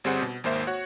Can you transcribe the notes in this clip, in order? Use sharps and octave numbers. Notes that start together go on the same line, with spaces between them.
G1 G3 C4 G#4 C5 F#5
B2
G#1 D#2 A#3 C5 E5
F#4 C#5 F#5